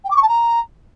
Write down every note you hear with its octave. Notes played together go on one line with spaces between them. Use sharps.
G5
D6
C#6
A5
A#5